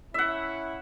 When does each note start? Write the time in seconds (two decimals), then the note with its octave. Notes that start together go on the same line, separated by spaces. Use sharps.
0.14 C#4 E4 E5 F#5